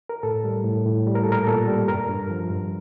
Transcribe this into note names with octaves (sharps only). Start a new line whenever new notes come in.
A#4
A2 A4
G3
A2
A2
G3
A#4
A#2 A4
A#4
A#2 A4
G3
G2 A#4
G2
F3
G2